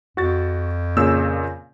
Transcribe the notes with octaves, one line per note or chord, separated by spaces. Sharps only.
F2 F#4 A6
A#2 C#3 E6